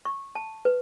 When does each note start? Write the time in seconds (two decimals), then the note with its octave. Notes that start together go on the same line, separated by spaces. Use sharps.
0.05 C#6
0.35 A5
0.65 B4